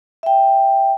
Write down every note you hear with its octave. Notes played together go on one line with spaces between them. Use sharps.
E5 G5